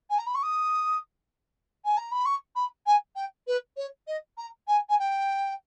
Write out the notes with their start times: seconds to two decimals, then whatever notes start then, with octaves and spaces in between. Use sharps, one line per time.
0.10 G#5
0.18 A#5
0.26 B5
0.35 C#6
0.43 D#6
1.85 G#5
1.97 A#5
2.11 B5
2.25 C#6
2.56 B5
2.86 G#5
3.16 G5
3.47 B4
3.77 C#5
4.07 D#5
4.37 A#5
4.67 G#5
4.89 G#5
4.99 G5